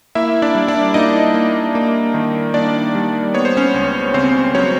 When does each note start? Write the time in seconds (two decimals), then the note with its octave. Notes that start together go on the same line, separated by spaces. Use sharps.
0.15 A#3 E4 E5
0.42 D4 D5
0.55 G3
0.68 D4 D5
0.94 A#3 D#4 D#5
1.34 A#3
1.75 A#3
2.14 D#3
2.54 A#3 D4 D5
2.95 G3
3.34 B3 C#5
3.45 C5
3.57 C#4 C#5
3.74 C#2
4.14 C#3 C4 C5
4.54 F#3 C#4 C#5